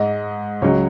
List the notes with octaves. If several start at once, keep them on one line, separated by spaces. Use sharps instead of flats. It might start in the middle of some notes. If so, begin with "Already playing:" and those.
Already playing: G#2 G#3 D#5
C#2 C#3 F#3 C#5